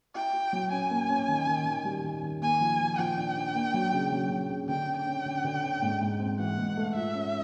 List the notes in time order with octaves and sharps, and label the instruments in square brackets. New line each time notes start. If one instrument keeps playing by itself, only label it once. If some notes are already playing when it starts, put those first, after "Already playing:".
[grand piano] E4 [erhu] G5
[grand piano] E4
F#3
[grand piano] C#4 [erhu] G#5
[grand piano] A#3
C#4
D#3
D#3
D#3
G3
D#3
D#3
[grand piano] A#3 [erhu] G#5
[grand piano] F3
F3
[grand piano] F3 [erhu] G5
[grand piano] D4
D4
A#3
F#3
C#3
F#3
C#3
C#3
[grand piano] D3 [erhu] G5
[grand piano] C#4
[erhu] G5
[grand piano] C#4
D3
D3
C#4
G#2
G#2
C4
[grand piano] E3 [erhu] F#5
[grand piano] G#2
A3
[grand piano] F4 [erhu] E5
[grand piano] C#4